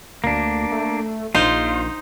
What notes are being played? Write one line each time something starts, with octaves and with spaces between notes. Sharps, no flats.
D2 A#3 D4
A3
A#1 D#4 F4 C5